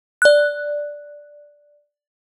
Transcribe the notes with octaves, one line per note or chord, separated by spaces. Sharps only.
D5 F#6